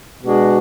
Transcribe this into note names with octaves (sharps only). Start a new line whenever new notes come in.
B2 G#3 D4 F#4